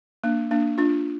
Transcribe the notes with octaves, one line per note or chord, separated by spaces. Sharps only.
A#3 D4
A#3 D4
D4 F4